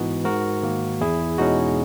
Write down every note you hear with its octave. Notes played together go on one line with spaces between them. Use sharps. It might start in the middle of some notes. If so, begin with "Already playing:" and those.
Already playing: G#2 E3 B3 D#4 F#4
G#2 F#4 A#4
D#3 A#3
E2 E4 G#4
B2 G#3 C#4 D#4 F#4